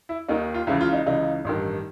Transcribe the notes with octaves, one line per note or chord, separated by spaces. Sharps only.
E4
D#2 D#3 D#4
F4
C#2 C#3 E3 E4
F4
D#4
C#2 C#3 E3 D#4
A1 G2 D#3